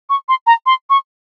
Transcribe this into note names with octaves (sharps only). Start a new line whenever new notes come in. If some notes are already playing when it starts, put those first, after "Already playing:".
C#6
C6
A#5
C6
C#6